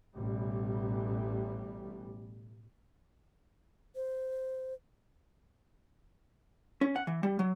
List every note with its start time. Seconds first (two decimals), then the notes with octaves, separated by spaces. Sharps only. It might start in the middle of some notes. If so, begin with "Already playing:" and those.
0.15 A1 B2 G3
3.96 C5
6.81 C#4
6.96 F#5
7.07 E3
7.23 G3
7.39 F#3